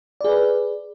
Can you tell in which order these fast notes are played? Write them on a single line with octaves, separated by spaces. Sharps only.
D5 G#4 B4